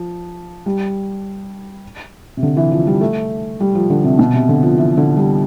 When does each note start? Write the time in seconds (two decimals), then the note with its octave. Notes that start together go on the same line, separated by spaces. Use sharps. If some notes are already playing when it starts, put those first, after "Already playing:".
Already playing: F3
0.66 G3
2.37 C3
2.43 D3
2.57 E3
2.72 F3
2.87 G3
3.01 A3
3.61 G3
3.75 F3
3.90 D3
4.04 C3
4.19 B2
4.33 C3
4.49 D3
4.63 F3
4.78 E3
4.97 D3
5.17 G3